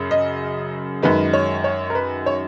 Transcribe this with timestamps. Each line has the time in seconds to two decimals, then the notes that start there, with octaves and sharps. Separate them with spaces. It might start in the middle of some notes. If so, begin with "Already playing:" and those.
Already playing: F#2 C#3
0.11 D#5
1.03 F#2 D#3 G#3 B4
1.33 C#5
1.64 C#5
1.90 A#4
1.95 B4
2.26 C#5